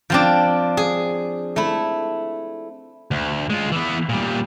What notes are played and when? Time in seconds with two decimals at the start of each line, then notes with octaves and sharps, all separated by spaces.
0.10 F3 C4 D4
0.77 G#4
1.56 A3 E4
3.11 D2
3.50 G#3 F4
3.72 E3 B3
4.09 A#2 G3